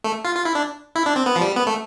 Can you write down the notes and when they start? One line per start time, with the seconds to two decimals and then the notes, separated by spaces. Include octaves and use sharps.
0.04 A3
0.25 F4
0.35 F4
0.45 E4
0.55 D4
0.95 E4
1.06 D4
1.16 C4
1.26 B3
1.36 F3
1.41 G3
1.56 B3
1.67 A3